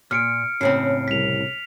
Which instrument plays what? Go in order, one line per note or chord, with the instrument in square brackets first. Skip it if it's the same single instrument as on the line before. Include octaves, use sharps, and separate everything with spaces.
[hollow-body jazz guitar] A#2 [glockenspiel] F6 C#7 D7
[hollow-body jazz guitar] A2 C#3 C4 [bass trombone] C#4 [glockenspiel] C7
[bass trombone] C2 [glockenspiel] B6 F7